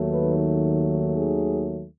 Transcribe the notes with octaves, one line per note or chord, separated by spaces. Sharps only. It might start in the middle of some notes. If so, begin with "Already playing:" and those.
Already playing: D#2 D#3 F#3 A3
B4
G#4